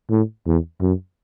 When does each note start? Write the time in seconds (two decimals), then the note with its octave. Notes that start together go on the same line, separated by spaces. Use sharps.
0.10 A2
0.46 E2
0.81 F#2